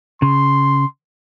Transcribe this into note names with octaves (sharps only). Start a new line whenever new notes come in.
C#3 C6